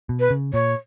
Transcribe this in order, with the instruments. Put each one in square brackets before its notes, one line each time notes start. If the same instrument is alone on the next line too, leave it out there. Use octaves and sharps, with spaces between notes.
[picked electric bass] B2
[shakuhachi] B4
[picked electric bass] C#3
[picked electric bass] A#2 [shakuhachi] C#5